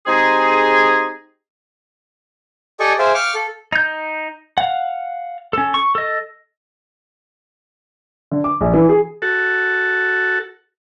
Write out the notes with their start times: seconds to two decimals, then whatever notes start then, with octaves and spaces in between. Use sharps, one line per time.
0.07 G#3 C4 D#4 G4 G#4
2.80 G4 A4 D5 D#5 G#5 C#6
2.99 G#4 C5 E5 F5 G5
3.14 F5 G5 C#6 D6 F6
3.35 A4
3.72 D#4 G6
4.58 F5 F#5
5.53 C#4 A4
5.74 C#6
5.95 A4 D#5
8.31 D3
8.44 D6
8.61 A#1
8.74 E3
8.89 G#4
9.22 F#4 A4